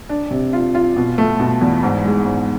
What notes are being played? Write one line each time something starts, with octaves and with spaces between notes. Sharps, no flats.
D4
C3
F4
F4
B2
A3
B2
E2
G#2
G#3
G#2